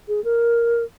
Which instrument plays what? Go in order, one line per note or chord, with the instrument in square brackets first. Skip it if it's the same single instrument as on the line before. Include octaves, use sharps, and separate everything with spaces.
[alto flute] G#4
A#4